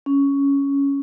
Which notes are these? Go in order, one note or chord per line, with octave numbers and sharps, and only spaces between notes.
C#4